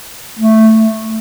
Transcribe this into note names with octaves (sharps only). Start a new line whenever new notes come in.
A3